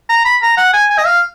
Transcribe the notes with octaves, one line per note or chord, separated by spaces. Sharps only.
A#5
B5
A#5
F#5
G#5
G#5
D#5
F5